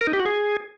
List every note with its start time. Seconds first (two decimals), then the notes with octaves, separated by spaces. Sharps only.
0.01 A#4
0.07 D#4
0.13 G4
0.19 F#4
0.26 G#4